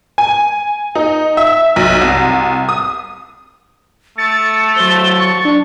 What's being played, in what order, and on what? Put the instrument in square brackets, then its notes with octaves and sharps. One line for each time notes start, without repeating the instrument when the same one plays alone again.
[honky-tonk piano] G#5
D#4
E5
B1
C2
D#6
[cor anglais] A3 [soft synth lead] A6 [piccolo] C#7
[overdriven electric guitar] F#3 C5 [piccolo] G7
[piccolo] C#6
[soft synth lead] D4